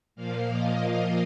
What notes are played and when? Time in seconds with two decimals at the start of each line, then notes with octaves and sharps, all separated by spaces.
0.16 A#2 F3 A#3 F5
0.50 D#5
0.84 F5